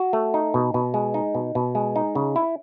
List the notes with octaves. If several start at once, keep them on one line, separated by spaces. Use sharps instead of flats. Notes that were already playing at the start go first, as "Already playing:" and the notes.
Already playing: F#4
A3
D#4
B2
B2
G#3
D#4
B2
B2
G#3
D#4
C#3
E4